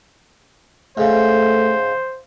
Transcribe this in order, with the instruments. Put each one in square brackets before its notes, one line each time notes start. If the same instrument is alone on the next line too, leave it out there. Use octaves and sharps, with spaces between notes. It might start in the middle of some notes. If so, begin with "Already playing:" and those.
[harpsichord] G#2 C#3 [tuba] A3 [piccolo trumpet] C5